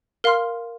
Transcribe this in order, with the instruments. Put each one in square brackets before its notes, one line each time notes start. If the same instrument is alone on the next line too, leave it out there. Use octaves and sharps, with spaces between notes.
[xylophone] A#4 F5 C6 F6